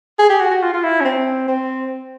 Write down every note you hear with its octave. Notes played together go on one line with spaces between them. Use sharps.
G#4
G4
F#4
F#4
F4
F4
E4
C#4
C4
C4